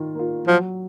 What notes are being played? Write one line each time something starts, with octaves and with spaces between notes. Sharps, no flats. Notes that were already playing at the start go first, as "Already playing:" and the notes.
Already playing: D#3 F4
A#3 F4
F3 F#3